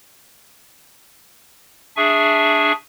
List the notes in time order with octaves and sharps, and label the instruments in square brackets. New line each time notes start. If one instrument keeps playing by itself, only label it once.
[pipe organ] D4 G#4 E5 G#5 C#6